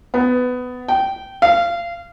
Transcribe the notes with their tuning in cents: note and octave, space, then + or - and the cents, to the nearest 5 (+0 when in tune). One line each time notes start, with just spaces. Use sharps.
B3 +15
G5 -20
F5 -25